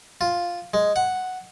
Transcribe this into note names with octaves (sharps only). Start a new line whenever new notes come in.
F4
G#3
F#5